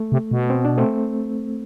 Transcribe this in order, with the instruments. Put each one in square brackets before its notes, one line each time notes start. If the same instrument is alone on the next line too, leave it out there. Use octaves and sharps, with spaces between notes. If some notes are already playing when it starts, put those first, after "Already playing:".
Already playing: [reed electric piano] A3
[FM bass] C3
B2
[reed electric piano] C4
D4
A3 C4